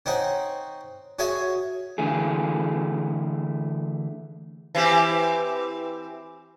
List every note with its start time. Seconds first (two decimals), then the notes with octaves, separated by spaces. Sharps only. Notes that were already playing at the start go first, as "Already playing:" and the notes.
0.06 C4 C#4 D#4 F#5
1.19 C#4 F#4 G#4 C#5 E5 G#5
1.98 D3 E3 A3 G#4
4.75 E3 C4 G4